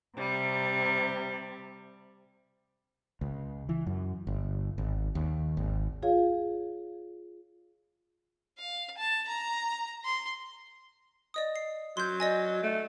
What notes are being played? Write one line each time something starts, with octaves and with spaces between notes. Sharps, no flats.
C3 G3
C#2
E3
F#2
G1
G#1
D#2
G#1
F4 G#4 C#5 F5
F5
A5
A#5
C6
D5 D#5 D#6
C7
F#3 C6 G6
D5 D#5 G#5
A3